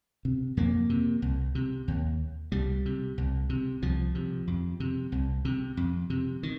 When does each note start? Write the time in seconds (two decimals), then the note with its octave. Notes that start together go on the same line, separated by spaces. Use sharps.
0.25 C3
0.57 F2 A#3
0.90 C3
1.22 C2
1.55 C3
1.88 D#2
2.52 C2 G3
2.86 C3
3.18 C2
3.49 C3
3.82 C2 F3
4.15 C3
4.47 F2
4.80 C3
5.12 C2
5.45 C3
5.77 F2
6.10 C3
6.43 D#3